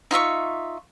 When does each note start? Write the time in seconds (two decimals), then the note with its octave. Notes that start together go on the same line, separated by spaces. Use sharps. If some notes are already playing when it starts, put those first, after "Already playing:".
0.11 D#4 F4 E5 C#6